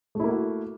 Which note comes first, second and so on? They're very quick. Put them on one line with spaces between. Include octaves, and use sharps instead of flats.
A3 E4 A#3 F#4